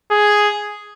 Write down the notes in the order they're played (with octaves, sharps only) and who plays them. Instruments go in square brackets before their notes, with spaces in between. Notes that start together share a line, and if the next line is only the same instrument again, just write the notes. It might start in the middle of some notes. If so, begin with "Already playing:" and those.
[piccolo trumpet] G#4